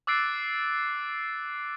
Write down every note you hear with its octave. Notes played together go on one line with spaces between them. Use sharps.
D6 E6 F#6 A6 C7 D7